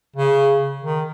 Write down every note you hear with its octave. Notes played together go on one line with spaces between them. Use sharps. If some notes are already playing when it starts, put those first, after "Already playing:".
C#3
D#3